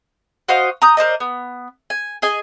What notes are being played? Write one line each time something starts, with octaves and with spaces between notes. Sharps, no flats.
F#4 C5 D#5 F5
A#5 D#6 G6
A#4 C5 D5 D#5
B3
G#5
G#4 D#5 G#5